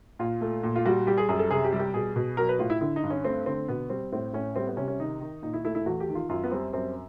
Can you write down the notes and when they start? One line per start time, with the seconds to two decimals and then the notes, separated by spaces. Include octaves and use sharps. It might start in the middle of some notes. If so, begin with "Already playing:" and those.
0.19 A#2 F4
0.41 A3
0.63 A#2
0.76 F4
0.85 G3 F#4
1.07 G3 G4
1.17 G#4
1.29 F#2 G#4
1.39 A4
1.50 C3 G#4
1.64 G4
1.73 G3
1.79 G4
1.94 B2 G#4
2.16 B2
2.37 F#3 A#4
2.49 B4
2.59 A2 F4
2.70 E4
2.81 D3 E4
2.96 D#4
3.03 G2
3.10 C#4
3.25 A3 C4
3.46 D3 C4
3.68 B2 B3
3.90 G3 C4
4.12 A2 C4
4.33 A2 C#4
4.56 G3 C4
4.67 B3
4.77 C3 C#4
4.88 C#4
5.00 D#3 D#4
5.21 D#3
5.42 A#2 D#4
5.54 E4
5.64 A3 E4
5.75 E4
5.86 E2 F#4
6.00 G4
6.09 D#3
6.15 F4
6.29 F#2 F4
6.44 B3
6.52 G3 C4
6.73 F#2 C4